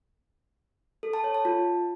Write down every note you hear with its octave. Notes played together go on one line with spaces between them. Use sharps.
A4
A5
C#5
A5
F4